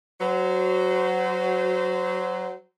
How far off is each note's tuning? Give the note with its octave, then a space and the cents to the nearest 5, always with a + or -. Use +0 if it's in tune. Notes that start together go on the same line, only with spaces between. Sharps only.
F#3 +5 C5 -25